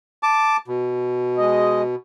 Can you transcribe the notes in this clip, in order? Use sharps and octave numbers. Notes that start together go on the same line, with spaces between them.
A5 D6
B2
G#3 D#5